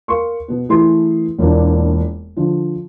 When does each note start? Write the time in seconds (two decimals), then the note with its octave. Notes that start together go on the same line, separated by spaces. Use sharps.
0.08 A#4 F5 C6 C#6
0.48 B2 B3
0.69 E3 A3 E4 G#4 C6
1.39 E1 A#2 A#3 D4
2.36 D3 F3